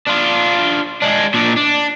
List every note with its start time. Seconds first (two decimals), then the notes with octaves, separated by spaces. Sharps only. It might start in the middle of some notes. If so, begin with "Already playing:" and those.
0.07 D4 F4
1.02 G#3 D4
1.34 A#2 D4
1.57 D4